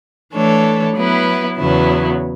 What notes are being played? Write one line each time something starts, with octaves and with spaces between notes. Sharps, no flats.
E3 A3 D4 A4 C#5
F#3 B3 E4 B4
E2 C#3 F#3 B3 E4